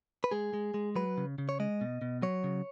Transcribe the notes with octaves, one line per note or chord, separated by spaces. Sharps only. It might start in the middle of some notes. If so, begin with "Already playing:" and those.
B4
G#3 G#4
G#3
G#3
F#3 B4
C#3
C#3
C#5
G#3 D#5
B2
B2
F#3 C#5
C#3